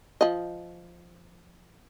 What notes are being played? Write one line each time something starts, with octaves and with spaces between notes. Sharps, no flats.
F3 D#5